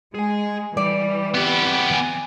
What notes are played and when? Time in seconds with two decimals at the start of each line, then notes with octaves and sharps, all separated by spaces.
0.15 G#3 G#4 G#5
0.77 E3 G3 D5
1.35 B3 C4 G4 B5
1.91 E3 G#5